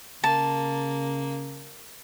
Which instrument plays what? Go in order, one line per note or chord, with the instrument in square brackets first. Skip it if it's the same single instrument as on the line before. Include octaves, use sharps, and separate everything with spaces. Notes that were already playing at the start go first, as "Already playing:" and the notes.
[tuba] C#3 [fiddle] A#3 [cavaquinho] A5